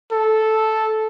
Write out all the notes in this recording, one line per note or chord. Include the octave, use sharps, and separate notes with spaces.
A4